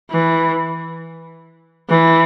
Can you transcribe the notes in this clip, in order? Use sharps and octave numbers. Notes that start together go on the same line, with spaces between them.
E3
E3